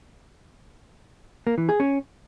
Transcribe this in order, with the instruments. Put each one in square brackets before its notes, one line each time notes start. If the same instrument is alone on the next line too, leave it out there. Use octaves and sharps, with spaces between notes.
[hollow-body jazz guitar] A#3
E3
G#4
C#4